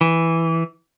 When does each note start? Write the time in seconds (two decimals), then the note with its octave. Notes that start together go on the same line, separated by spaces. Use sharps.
0.01 E3